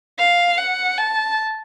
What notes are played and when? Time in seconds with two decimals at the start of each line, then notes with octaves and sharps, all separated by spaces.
0.18 F5
0.58 F#5
0.98 A5